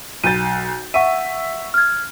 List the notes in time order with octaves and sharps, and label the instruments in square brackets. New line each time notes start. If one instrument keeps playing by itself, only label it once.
[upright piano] B1 G6 A6 [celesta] D#7
[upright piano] E5 C#6 E6 [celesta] F#5 D#7
[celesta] F6 G#6